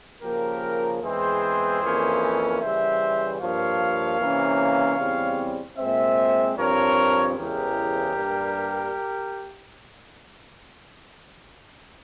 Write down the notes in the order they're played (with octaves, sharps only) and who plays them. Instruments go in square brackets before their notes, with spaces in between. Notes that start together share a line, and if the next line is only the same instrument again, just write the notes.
[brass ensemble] C#3 F3 A#3 G4 A#4
E2 E3 G#3 C4 G#4 C5
F2 E3 A#3 C#4
C#3 E3 G3 C5 E5
G2 F3 A#3 C#5 F5
C3 E3 A#3 C#4
E2 C#3 G3 C4
A#2 G#3 C4 C5 E5
G2 F3 C4 A#4 C#5
E2 C#3 E3 G#3 G4 A#4
G2 G3 A#3